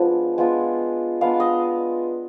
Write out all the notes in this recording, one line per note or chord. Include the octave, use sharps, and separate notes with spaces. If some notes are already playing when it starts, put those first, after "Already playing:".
Already playing: F3 G#3 B3 D4
G#3 B3 D4 F4
G#3 B3 D4 F4 F5
D#5